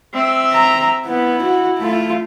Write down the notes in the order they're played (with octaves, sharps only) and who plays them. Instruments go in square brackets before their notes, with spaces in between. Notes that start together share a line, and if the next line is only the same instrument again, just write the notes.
[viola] C4 E5
[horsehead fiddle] A#5
[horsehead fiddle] B3 [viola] E4
[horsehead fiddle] F#4
A3 F4